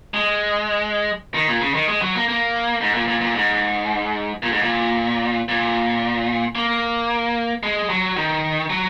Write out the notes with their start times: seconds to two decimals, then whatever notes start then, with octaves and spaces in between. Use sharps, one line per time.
0.14 G#3
1.34 D#3
1.48 A#2
1.61 C#3
1.74 D#3
1.88 G#3
2.02 F#3
2.15 A#3
2.28 A#3
2.81 G#2
2.95 A#2
3.08 A#2
3.21 A#2
3.36 G#2
4.43 A#2
4.52 G#2
4.62 A#2
5.48 A#2
6.55 A#3
7.63 G#3
7.89 F#3
8.17 D#3
8.70 F#3